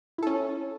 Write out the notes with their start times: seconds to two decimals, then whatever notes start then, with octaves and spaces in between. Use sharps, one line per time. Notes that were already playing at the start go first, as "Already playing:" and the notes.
0.18 E4
0.23 A4
0.27 C#4